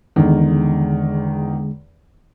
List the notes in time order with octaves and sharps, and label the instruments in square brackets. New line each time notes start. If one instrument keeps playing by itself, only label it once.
[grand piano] E2 D#3 [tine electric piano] D3 G#3